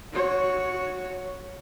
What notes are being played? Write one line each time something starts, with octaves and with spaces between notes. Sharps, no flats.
F#4 C#5